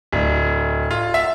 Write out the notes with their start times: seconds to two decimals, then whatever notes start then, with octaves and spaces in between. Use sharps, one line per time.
0.12 D1
0.91 F4
1.14 E5